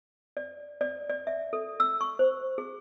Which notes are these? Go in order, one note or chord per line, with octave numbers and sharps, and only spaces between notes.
D5
D5
D5
E5
A4
E6
C#6
C5
G#4